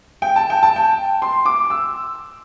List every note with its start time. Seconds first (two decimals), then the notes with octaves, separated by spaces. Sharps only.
0.22 G5
0.36 A5
0.50 G5
0.63 A5
0.76 G5
1.22 C6
1.46 D6
1.70 E6